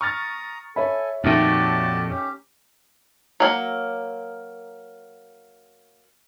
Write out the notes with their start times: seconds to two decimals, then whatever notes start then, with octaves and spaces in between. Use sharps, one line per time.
0.01 A#5 C#6 D#6 F6 A6
0.76 A4 C#5 E5 G#5 B5
1.24 F2 A#2 D#3 A3 F#4 G4 A5
2.10 C#4 G4
3.40 F#3 A#3